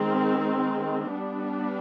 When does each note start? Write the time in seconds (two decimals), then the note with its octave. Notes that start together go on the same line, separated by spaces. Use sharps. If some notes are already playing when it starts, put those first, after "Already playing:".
Already playing: D#3 G#3 C4
1.11 G3 B3 D4